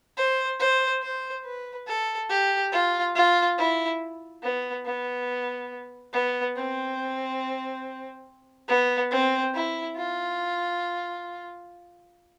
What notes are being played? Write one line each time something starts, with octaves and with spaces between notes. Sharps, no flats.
C5
C5
C5
B4
A4
G4
F4
F4
E4
B3
B3
B3
C4
B3
C4
E4
F4